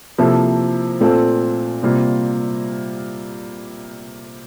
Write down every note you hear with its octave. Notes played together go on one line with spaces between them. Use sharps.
C3 F3 A#3 E4 A4
A#2 A3 C4 F4 A4
C3 G3 A#3 F4